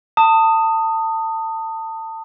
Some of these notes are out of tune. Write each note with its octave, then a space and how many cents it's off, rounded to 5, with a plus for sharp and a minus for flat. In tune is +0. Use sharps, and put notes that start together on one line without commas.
A5 +30 D#6 +0